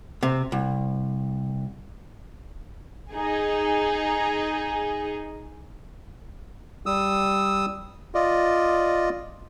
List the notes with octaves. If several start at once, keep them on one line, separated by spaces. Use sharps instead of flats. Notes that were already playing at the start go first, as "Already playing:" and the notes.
C3
C2
D#4 G#4
G3 D#6 E6
F4 D5 D#5